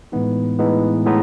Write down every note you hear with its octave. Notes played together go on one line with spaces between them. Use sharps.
A2 E3 G#3 B3 D#4
A2 E3 G#3 B3 D#4
A2 E3 G#3 B3 D#4